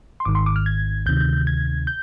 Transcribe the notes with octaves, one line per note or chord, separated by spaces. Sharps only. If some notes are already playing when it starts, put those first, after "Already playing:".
C6
G#1 G#2 D#3 D6
C6
D6
F6
G#6
D2 C3 D#3 G6
G#6
G6